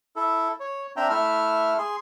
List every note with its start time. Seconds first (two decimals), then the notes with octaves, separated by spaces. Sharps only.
0.16 E4 A4
0.60 C#5
0.96 C4 D4 E5 G5 A#5
1.10 A3 E4 E5 F6
1.78 G#4 C6